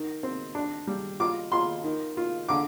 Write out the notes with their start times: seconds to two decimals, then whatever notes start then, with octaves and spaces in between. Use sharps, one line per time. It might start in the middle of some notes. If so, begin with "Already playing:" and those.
Already playing: D#3
0.23 C4
0.55 D4
0.87 G3
1.20 F4 D6
1.52 F4 C6
1.84 D#3
2.17 F4
2.49 D3 D6